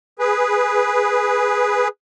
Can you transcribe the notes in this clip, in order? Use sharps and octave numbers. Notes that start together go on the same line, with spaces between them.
G#4 B4